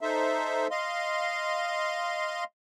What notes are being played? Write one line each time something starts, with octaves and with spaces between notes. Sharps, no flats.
D#4 A4 C5 E5
D#5 F5 C6